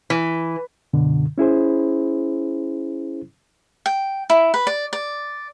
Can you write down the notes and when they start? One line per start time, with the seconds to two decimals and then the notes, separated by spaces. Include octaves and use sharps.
0.10 E3
0.93 F#2 B2 D3
1.38 C#4 E4 G#4 C5
3.86 G5
4.30 E4
4.54 B4
4.67 D5
4.93 D5